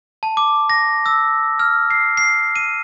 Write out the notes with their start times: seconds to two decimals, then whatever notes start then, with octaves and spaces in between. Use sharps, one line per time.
0.23 A5
0.37 D6
0.70 A#6
1.06 E6
1.59 F6
1.90 C7
2.17 C7
2.56 D#7